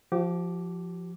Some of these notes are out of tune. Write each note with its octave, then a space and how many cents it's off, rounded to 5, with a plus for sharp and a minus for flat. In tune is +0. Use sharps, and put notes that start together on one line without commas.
F3 +0 G4 -35 D6 +0